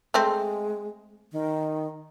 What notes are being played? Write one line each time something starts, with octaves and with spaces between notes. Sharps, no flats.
G#3 A3 C4
D#3